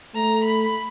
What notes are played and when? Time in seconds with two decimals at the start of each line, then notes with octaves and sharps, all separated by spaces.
0.15 A3 A#5
0.44 B5